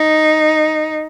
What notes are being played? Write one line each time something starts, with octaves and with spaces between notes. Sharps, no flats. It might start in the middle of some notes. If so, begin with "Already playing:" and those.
Already playing: D#4